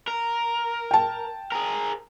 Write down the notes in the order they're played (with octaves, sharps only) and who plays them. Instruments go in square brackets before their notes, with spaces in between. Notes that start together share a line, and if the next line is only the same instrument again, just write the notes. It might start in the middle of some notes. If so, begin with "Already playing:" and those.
[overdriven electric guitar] A#4
[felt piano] G5 A5
[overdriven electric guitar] G#4 A#4